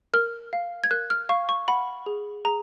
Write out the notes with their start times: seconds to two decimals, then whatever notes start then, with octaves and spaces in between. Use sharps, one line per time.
0.14 A#4 F6
0.53 F5
0.84 G#6
0.91 A#4 F#6
1.10 F6
1.29 F5 C#6
1.49 C#6
1.68 F#5 B5
2.06 G#4
2.45 G#4 A#5